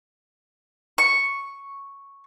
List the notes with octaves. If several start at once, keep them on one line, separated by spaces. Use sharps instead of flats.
C#6